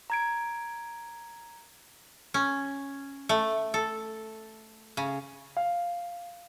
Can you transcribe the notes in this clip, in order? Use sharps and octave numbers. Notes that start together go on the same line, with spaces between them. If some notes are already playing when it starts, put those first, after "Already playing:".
A#5 G#6 D7
C#4
A3
A4
C#3
F5